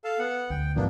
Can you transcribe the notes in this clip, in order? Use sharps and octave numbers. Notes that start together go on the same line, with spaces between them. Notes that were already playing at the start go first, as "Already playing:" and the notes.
A4 F5 A5
B3 F#5
D2 G5
G#2 C3 F3 A#3 B3 D4